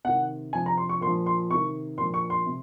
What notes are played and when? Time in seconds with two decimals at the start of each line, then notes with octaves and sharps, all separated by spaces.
0.04 C3 D#3 F#5
0.53 C3 F3 G#5
0.66 A#5
0.77 C6
0.89 C#6
1.01 A#2 C6
1.07 F3
1.26 C6
1.50 C3 D#3 C#6
1.98 A#2 C6
2.01 F3
2.14 C#6
2.30 C6
2.46 C3